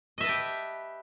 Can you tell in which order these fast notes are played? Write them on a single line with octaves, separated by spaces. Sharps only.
D#5 E5 B4 A5 G4